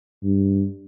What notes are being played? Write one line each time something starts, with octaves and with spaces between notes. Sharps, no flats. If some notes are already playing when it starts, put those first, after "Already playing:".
G2